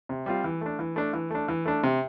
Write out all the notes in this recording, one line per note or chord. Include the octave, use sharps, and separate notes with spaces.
C3
G3 C4 F4
E3
A3 D4
E3
A3 D4
E3
A3 D4
E3
A3 D4
C3